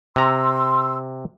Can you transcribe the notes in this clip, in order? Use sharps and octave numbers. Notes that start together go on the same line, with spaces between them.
C3 A#5 C6 E6